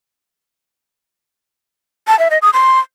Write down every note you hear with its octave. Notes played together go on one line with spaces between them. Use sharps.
A5
E5
D#5
D#6
C6